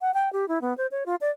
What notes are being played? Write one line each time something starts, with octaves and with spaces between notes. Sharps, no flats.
F#5
G5
G4
E4
B3
C5
C#5
F4
D5